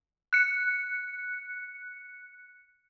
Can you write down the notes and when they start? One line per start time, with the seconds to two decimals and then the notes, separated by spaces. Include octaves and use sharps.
0.33 F#6 C#7